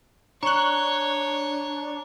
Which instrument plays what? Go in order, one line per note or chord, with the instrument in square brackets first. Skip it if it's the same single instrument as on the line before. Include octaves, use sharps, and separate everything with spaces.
[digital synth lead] D4 [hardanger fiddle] C#5 [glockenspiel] A#5 G7 [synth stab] C#6 F#6